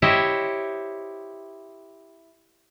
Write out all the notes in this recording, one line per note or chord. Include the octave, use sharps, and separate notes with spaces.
E4 G4 C5 C#5 D#5